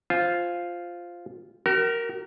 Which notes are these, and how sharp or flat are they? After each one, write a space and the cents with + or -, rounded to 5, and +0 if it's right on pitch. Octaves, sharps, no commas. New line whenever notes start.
F4 +0 C5 +0 G#5 +0
F#4 +45 A#4 +0